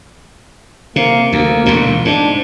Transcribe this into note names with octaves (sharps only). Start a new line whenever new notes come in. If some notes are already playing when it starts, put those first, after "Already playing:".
C3 A#3
D2 A#3
E1 D2 A#2
G#2 D4